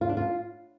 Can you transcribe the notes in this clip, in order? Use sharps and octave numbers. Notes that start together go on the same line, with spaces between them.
F4
D4
F4